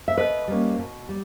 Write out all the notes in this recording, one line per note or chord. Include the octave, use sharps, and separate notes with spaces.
E5
B2 B4 D#5
G3 A#3 C#4
B2
G3